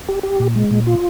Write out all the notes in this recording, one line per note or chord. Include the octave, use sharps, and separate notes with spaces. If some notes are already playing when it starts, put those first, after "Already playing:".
G4
G4
A#2
G#3
A#2
F4